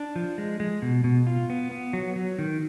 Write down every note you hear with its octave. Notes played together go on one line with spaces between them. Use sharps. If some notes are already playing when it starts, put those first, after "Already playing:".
Already playing: D4
F3
G#3
G#3
B2
B2
F4
B3
B3
F#3
F#3
D#3